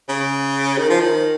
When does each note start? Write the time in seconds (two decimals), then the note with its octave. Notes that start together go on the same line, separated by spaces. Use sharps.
0.09 C#3
0.78 D#3
0.90 F3
1.00 D#3